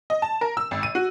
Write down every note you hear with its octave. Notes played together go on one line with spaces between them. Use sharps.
D#5
A5
A#4
E6
G#1
D#7
F#4